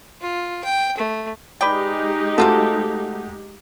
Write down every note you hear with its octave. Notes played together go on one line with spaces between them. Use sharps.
F4
G5
A3
G#3 D#4 G4 B4 D5 G5
C3 A3 F4 F#4 A4 F#5